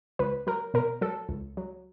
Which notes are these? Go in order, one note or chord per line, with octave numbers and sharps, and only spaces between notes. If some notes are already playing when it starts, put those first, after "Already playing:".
C#2 B4
F#3 A#4
B2 A#4
F#3 A4
C#2
F#3